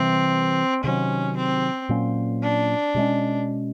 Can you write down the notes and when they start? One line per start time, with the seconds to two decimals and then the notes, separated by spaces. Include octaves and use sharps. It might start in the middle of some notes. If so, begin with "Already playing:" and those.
Already playing: C3 E3 G3 C4
0.84 C3 D#3 F#3 C#4
1.37 C4
1.89 A#2 F#3 A#3 C#4
2.43 D4
2.95 B2 G#3 C#4